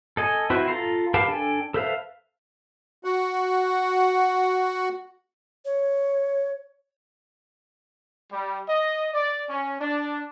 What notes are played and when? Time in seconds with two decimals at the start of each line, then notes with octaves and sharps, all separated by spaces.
0.17 A4 D#5 G#5
0.50 C4 E4 F#4 B4 C5
0.68 F4 A4 A#5 C6
1.14 G4 A#4 B4 F5 A5
1.28 D4 A4 G5 G#5
1.74 A4 B4 C5 E5 F5
3.04 F#4 F#5
5.65 C#5
8.32 G3
8.69 D#5
9.14 D5
9.49 C#4
9.81 D4